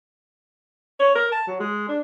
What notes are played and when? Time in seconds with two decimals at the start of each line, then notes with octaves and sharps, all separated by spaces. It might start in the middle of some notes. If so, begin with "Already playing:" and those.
0.99 C#5
1.15 A#4
1.32 A5
1.47 F#3
1.60 G#3
1.89 D4